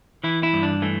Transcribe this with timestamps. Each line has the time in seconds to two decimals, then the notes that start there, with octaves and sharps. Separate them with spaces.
0.24 E3 E4
0.43 E4
0.53 G2
0.63 D4
0.82 E3 A3